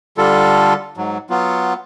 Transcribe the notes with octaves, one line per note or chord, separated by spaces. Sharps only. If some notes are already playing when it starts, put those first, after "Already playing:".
D3 G3 F4 A4
G#2 F#3
F#3 B3 F4